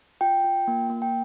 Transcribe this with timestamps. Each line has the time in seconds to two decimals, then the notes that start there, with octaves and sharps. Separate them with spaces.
0.21 F4 G5
0.44 F4
0.68 A#3
0.90 A#3
1.02 G5